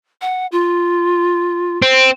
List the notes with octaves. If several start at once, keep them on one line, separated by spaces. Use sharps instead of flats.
F#5
F4
C4